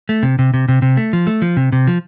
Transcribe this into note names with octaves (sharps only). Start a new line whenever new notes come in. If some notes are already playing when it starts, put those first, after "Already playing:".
A3
C3
C3
C3
C3
C3
A3
F3
A3
F3
C3
C3
F3